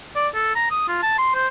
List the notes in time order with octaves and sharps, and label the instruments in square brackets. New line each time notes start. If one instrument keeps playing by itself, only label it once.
[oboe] D5
A4
A#5
D#6
F4
A5
C6
C5